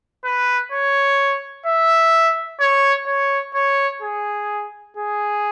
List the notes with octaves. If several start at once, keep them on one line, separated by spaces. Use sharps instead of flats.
B4
C#5
E5
C#5
C#5
C#5
G#4
G#4